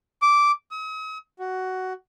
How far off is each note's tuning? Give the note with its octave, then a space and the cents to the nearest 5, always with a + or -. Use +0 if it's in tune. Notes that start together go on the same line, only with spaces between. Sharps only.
D6 -10
D#6 +45
F#4 +10